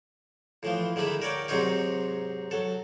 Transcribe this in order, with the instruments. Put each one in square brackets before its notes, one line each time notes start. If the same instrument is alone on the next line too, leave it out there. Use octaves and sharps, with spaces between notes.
[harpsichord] A2 E3 F3
D3 D#3 G#3 E5 B5
A#4 C#5 D5 G5
G#2 C3 F#3 C4 D#4 C#5
F#3 A4